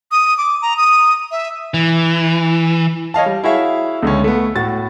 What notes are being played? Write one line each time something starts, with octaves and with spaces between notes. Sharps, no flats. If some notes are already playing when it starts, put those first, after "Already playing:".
D#6
D6
A#5
D#6
E5
E3
C#5 D#5 F5 A5
G3
E4 F#4 G#4 C#5 E5 F5
C#2 D3 C#4
A3 B3
A2 F#4 A6